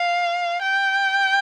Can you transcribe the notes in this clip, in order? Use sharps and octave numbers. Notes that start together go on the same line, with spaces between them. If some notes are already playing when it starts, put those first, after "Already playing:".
Already playing: F5
G5